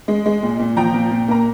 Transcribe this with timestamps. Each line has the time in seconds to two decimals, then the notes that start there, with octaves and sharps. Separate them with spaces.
0.08 G#3
0.26 G#3
0.43 A#2
0.59 A#2
0.76 F3 G5 A#5
0.94 A#2
1.11 A#2
1.28 A#3 A#5